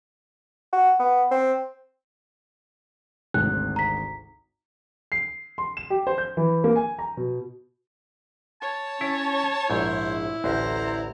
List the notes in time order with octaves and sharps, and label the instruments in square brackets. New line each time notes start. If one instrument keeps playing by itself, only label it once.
[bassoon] F#4
B3
C4
[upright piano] G#1 D2 C3 [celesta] F#6
[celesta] A#5 B6
[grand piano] C7
C6
E7
G4
C5
G6
E3
A#3
G#5
A#5
B2
[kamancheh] C#5 [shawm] A5
[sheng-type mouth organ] C#4 [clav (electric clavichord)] E4
[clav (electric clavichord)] A#1 G#2 [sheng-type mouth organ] E4 [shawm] C5
[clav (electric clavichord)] A1 D2 [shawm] C5 [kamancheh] A#5